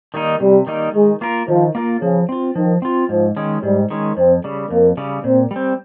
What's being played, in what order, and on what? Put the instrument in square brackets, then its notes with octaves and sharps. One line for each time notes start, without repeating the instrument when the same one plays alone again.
[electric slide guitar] D#3 G3 A#3 D#4
[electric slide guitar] C3 [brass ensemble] G3
[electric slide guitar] D#3 G3 A#3 D#4
[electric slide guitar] D#3 [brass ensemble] G#3
[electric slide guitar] A#3 F4 A#4
[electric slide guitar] D#3 [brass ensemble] F3
[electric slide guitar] A#3 F4 A#4
[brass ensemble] C#3 [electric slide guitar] F3
[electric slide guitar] C4 F4
[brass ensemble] D#3 [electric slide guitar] F3
[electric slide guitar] C4 F4
[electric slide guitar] G#2 [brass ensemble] F3
[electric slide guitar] D#3 G#3 C#4
[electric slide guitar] G#2 [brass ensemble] G3
[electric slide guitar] D#3 G#3 C#4
[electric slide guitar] F2 [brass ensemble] C4
[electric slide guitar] C#3 G3
[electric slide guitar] F2 [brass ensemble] A#3
[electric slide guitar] C#3 G3
[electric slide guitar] A#2 [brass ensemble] C4
[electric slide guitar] G3 C4